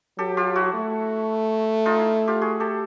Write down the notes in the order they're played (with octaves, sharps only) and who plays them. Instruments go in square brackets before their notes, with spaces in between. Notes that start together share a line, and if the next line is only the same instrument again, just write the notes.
[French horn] F#3 [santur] G4 A4
[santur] F4 G4
E4 F#4
[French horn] A3
[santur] D#4 F4
E4
F4 G4
F#4 G#4
G4 A4